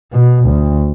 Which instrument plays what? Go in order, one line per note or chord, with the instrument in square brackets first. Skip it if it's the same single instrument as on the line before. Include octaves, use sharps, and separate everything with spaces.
[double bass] B2
D2